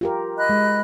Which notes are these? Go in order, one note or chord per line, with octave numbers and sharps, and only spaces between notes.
F4 G4 A#4
D#5 B5 F#6
G#3